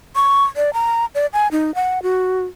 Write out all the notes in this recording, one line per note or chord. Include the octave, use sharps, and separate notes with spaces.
C#6
D5
A#5
D5
G#5
D#4
F#5
F#4